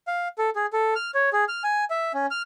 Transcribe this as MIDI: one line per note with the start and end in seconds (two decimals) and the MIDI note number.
0.07 0.28 77
0.38 0.50 69
0.56 0.66 68
0.73 0.94 69
0.95 1.11 89
1.14 1.30 73
1.33 1.44 68
1.48 1.63 89
1.64 1.85 80
1.90 2.12 76
2.14 2.26 61
2.31 2.42 89